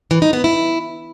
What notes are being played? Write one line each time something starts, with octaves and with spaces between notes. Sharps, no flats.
E3
D#4
B3
E4